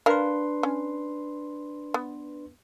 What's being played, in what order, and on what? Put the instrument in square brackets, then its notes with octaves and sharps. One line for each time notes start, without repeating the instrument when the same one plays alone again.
[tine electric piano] D4 B4 C6 [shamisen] A#4 F5
[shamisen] C#4
B3